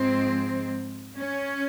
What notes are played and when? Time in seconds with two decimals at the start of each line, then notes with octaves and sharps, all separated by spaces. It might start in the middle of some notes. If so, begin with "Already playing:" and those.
Already playing: G#2 F3 G#3 C4
1.17 C#4